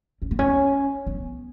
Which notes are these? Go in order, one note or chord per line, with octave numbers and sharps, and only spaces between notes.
C#4
B3
C#4
B3